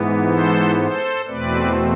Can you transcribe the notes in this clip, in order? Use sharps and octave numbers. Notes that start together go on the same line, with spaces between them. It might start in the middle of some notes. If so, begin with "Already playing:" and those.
Already playing: G#2 E3 B3
A4 C5
A4 C5
E2 B2 A3 C4 B4 D5